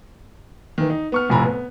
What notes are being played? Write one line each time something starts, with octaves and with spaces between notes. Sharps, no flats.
D#3 E3
D#4
B3 C#6 F6
F1 F2 A2 G#5 A#5 B5
B3